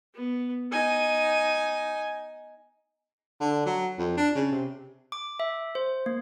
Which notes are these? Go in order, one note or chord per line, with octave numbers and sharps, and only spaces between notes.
B3
D#4 G#5
D3
F#3
F2
D4
C#3
C3
D6
E5
C5
A#3